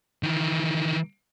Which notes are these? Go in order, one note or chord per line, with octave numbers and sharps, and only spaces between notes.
D#3 E3